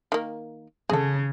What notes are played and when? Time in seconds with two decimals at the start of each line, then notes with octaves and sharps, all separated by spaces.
0.12 D#3 A#3
0.89 C#3 G#4 A4